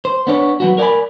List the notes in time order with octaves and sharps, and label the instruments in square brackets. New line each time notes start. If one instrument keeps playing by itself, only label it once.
[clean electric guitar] C5
B3 D4 C#5
F#3 B3 F#4
A#4 D5 G5 G#5 B5